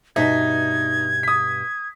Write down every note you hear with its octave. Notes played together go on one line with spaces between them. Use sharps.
G2 B2 D#4 E5 G#6
D#6 B6